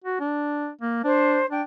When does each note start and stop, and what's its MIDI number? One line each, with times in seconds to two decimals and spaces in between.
0.04 0.19 66
0.20 0.69 62
0.82 1.03 58
1.04 1.40 62
1.04 1.46 72
1.51 1.62 62
1.51 1.62 79